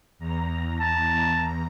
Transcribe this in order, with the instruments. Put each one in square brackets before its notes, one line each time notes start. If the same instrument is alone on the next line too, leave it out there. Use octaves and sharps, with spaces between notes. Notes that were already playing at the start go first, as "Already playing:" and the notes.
[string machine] E2 A#5
[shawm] A5